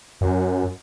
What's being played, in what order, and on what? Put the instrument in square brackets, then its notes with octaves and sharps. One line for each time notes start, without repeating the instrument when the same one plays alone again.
[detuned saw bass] F#2